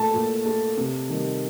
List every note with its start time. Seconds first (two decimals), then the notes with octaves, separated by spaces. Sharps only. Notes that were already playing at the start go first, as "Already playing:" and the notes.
Already playing: A#2 A3 A5
0.14 A#2
0.45 A3
0.77 C3
1.09 D#3 G3